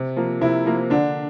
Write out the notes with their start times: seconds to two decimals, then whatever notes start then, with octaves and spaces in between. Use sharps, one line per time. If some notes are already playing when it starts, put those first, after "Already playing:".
Already playing: C3
0.16 F3 A#3
0.41 C3 E4
0.65 F3 A#3
0.90 D3 D4